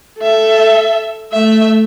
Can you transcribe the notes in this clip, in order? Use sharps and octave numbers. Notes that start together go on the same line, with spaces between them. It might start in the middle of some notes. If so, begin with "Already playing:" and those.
A4 E5
A3 E5